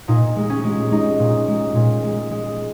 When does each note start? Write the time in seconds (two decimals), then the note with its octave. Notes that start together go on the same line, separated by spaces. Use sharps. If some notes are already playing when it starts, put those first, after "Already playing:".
0.08 A#2 D#4
0.36 G#3
0.50 C#4
0.64 G#3
0.91 G#3 D#4
1.19 A#2
1.48 G#3
1.75 A#2
2.03 G#3
2.31 G#3